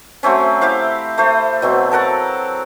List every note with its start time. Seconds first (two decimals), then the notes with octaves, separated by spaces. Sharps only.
0.23 F#3 A3 C4 C#4
0.61 E4 G4 C5 F5
1.18 A3 C5 B5
1.62 B2 F#3 C4
1.92 A4 A#4 F#5 A5